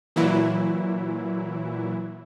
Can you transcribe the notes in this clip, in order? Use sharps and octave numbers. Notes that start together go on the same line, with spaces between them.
A#2 E3 F#3 E4